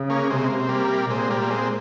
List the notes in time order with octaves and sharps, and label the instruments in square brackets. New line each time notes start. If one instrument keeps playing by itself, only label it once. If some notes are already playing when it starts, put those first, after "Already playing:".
Already playing: [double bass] C#3
[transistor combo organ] A#3 C#4
[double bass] C3 [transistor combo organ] G#3 C4
[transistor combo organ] A#3
C4
[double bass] C3 [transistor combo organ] G3 A#3
[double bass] A#2 [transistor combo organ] G#3 C4
[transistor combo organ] G3 A#3
A#3
G#3 C4